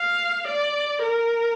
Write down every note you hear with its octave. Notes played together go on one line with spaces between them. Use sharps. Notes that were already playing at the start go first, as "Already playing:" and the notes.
Already playing: F5
D5
A#4